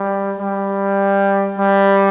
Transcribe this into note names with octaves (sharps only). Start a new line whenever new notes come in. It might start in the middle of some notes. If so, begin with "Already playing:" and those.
Already playing: G3
G3
G3